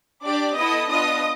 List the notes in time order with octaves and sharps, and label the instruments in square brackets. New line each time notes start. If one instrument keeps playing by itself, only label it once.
[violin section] D4 G4 D5 D6
B3 E4 A4 D#5 D#6
B3 D4 F4 D#5 D#6